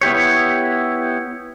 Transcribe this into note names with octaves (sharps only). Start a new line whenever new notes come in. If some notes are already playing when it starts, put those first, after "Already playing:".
B3 E4 G4 C#5